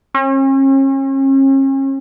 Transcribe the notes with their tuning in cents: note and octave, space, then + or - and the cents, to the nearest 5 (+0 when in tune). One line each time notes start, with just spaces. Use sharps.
C#4 -40